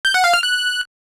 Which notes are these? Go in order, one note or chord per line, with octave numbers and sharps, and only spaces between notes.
G6
F#5
F5
F6
F#6